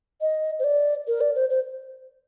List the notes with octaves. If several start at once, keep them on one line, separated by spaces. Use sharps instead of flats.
D#5
C5
D5
A#4
D5
C5
C5